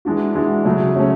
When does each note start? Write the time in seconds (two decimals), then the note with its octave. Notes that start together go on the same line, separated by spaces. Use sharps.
0.05 E3 G#3 D4 F#4
0.35 E3 G#3 D4 F#4
0.65 C#3 F#3 A3 C#4
0.95 C#3 F#3 A3 C#4